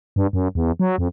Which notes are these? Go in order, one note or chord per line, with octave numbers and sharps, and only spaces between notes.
G2
F#2
E2
F#3
F2